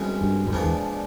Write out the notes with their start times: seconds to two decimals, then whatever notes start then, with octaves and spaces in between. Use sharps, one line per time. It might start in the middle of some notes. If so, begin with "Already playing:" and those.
Already playing: C2 B2 G#3 C#4
0.21 G2
0.46 F#2
0.52 F2 A#2 F3 G#3 B3 D4
0.63 E2